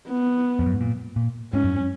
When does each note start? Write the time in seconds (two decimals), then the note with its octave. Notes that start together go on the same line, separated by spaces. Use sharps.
0.08 B3
0.59 F2
0.66 F#2
0.74 G#2
0.81 A#2
1.16 A#2
1.53 G#2 C#4
1.64 F#2